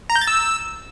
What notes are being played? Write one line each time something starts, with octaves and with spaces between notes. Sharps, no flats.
A#5
G6
A6
E6